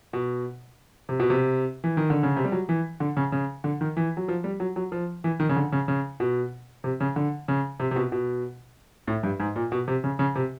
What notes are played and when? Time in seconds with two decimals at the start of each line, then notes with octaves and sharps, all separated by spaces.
0.13 B2
1.09 C3
1.20 B2
1.30 C3
1.84 E3
1.97 D#3
2.10 D3
2.23 C#3
2.36 C3
2.45 G3
2.52 F#3
2.69 E3
3.00 D3
3.17 C#3
3.32 C#3
3.64 D3
3.81 D#3
3.97 E3
4.17 F#3
4.28 F3
4.44 G3
4.60 F#3
4.76 F#3
4.92 F3
5.24 E3
5.40 D#3
5.49 C#3
5.56 D3
5.72 C#3
5.88 C#3
6.20 B2
6.84 C3
7.00 C#3
7.16 D3
7.48 C#3
7.80 C3
7.91 C3
7.96 B2
8.12 B2
9.07 A2
9.23 G2
9.40 G#2
9.56 A#2
9.72 B2
9.88 C3
10.04 C#3
10.19 C#3
10.35 C3